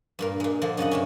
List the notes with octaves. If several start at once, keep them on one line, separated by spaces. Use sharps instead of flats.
G2 A#2 A#4
A#2 G#3
D3 F3 A#3
F#2 C#3 D#5 F#5
G2 C3 C#4